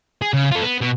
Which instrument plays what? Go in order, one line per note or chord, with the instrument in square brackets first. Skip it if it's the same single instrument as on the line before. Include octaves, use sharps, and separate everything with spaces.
[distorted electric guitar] G#4
C#3
F4 A4
B3
B2